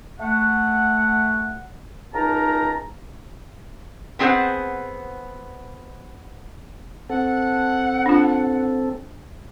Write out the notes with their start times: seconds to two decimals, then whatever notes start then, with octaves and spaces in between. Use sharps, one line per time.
0.20 A3 F#5
2.14 C#2 D#4 A#4 A5 A#5
4.19 B3 C4 G#4 B4 C5 F#5
7.10 C4 A4 F#5
8.06 D4 F4